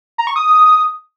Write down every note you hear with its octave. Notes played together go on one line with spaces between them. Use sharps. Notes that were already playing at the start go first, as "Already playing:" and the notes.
A#5
C#6
D#6